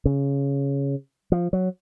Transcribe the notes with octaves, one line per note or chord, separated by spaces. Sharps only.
C#3
F3
F#3